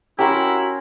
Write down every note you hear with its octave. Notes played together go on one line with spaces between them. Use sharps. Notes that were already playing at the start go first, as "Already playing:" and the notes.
C#4 E4 F#4 G4 A#4 C6